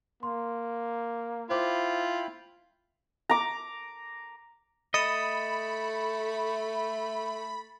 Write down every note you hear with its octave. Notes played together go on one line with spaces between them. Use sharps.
A#3 C6
E4 F4 C5 G5 B5 D6
A#5 D6
A3 D#5 B5 A6 C#7 E7